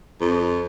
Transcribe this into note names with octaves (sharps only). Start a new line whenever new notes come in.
F2